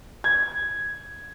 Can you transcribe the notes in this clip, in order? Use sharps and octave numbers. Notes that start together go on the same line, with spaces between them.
G#6